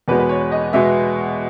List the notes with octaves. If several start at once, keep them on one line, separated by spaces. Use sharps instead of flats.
E2 B2 G#3 B3 B4
B4
C#5
D#5
B2 G#3 B3 E5